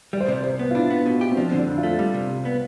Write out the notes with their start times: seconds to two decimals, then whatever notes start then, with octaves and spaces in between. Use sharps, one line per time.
0.13 G3 D5
0.21 C5
0.28 C3 D5
0.43 C2 C5
0.59 B3
0.71 F4
0.74 D4 E4
0.90 B3
1.06 B2
1.21 G4
1.32 C4
1.36 F3 D4
1.51 D3 C4
1.58 D4
1.67 F2
1.78 F4
1.83 A3
1.99 G3
2.14 C3
2.29 C2
2.45 B3